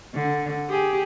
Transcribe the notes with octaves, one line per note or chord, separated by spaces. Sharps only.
D3
G4 G#4